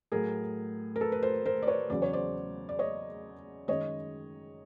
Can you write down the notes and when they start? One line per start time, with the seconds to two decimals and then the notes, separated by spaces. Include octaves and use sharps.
0.12 A2 F#3 G#4 A#4
0.96 A#4
1.00 A4 B4
1.12 B4
1.22 A#4 C5
1.46 A#4 C5
1.62 D5
1.67 B4 C#5
1.90 E2 C#3 F#3 D5
2.02 C#5
2.13 C5 D5
2.69 D5
2.79 C#5 D#5
3.68 F#2 D#3 G#3 C#5 D#5